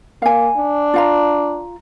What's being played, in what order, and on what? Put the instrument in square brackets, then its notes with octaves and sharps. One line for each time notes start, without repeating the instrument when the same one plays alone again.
[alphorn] A#3 [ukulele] F5 G#5
[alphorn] D4
[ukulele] F4 F5 A#5